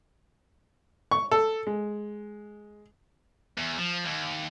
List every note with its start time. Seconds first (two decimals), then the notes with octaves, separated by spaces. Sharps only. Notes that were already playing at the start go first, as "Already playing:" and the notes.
1.11 C#6
1.31 A4
1.67 G#3
3.58 E2
3.78 F3
4.05 D#2